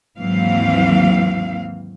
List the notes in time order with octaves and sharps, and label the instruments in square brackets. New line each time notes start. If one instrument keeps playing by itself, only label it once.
[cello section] D#2 G#2 E3 F#3 C4 F5